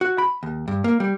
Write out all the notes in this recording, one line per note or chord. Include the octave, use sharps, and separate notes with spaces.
F#4
B5
D#2
G2
A#3
G3